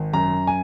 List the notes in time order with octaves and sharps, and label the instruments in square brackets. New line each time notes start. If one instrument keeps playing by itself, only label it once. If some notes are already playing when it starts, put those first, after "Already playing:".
Already playing: [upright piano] G#1
F#2 A#5
G#5